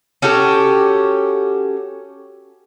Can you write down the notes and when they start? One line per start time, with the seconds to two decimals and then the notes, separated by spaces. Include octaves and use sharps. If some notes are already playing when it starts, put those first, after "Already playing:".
0.22 C#4 F#4 G4 A4